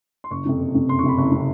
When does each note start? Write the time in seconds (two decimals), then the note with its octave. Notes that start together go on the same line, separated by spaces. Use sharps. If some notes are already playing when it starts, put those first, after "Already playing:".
0.24 C6
0.31 F#1 C#6
0.45 F2 C3
0.60 F#1
0.75 F2 C3
0.89 F#1 C6
0.99 C#6
1.04 F2 C3 B5
1.18 F#1 C#6
1.32 C3